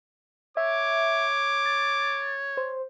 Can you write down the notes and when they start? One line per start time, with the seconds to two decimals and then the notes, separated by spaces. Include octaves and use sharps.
0.57 C#5 E5 D6
1.66 A6
2.57 C5